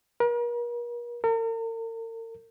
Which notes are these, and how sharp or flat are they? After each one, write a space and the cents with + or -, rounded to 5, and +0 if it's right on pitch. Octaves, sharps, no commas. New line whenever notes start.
A#4 +45
A#4 -40